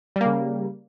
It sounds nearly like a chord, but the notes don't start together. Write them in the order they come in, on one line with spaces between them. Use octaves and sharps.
G3 A#3 C#3